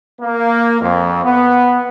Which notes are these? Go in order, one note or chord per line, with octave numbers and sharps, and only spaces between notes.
A#3
F2
B3